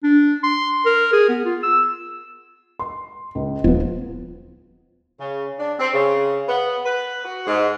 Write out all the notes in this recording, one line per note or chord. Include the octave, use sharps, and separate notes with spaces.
D4
C6
A#4
G#4
B3
F4
E6
C6
C#2
D#1 F3 B3
C#3
D4
C4
C#3
B3
B4
F#4
G#2